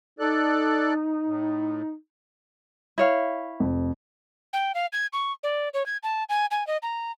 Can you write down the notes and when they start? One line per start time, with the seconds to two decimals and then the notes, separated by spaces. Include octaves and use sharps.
0.19 D#4 A4 D5 F#6
1.26 A2
2.98 E4 C#5 F5
3.60 F1 F2
4.53 G5
4.75 F5
4.93 G#6
5.13 C#6
5.43 D5
5.74 C#5
5.86 G#6
6.03 A5
6.29 G#5
6.51 G#5
6.67 D#5
6.83 A#5